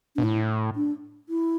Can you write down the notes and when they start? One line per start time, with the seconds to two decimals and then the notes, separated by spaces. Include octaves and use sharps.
0.16 B2 D4
0.23 A2 E4
0.76 D4
1.29 E4